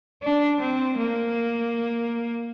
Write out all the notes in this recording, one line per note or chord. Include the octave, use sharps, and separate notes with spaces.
D4
C4
A#3